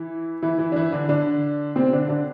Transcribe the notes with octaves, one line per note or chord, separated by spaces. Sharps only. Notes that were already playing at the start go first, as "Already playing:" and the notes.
Already playing: E3 E4
E3 E4
E3 E4
D4
E3 E4
D3 D4
D3 D4
C3 C4
D3 D4
D3 D4